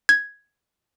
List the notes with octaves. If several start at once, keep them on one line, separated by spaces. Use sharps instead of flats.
G#6